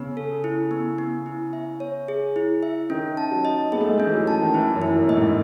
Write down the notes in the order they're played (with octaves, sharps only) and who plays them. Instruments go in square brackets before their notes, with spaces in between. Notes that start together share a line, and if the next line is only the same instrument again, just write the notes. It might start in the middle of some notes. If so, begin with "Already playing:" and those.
Already playing: [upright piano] C#3 [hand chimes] B3
[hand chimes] A4
E4
B3
B3
E4
E5
C#5
G#4
E4
E5
[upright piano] D#3 [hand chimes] C#4
[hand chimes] A5
[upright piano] F#3
[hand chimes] D#5
[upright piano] B3 [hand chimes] G#4
[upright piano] A3
G#3
[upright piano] A3 [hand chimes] C#4
[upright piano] E3
F#3
[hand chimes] A5
[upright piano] D#3
[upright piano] E3 [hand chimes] E4
[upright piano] F#2
[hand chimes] E4
[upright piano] F#2
[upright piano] A2 [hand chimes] D#5
[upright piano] G#2